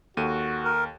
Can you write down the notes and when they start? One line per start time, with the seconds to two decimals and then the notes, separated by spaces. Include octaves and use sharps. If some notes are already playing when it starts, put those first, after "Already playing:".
0.17 D#2 F#4 A4 D#7
0.65 A#4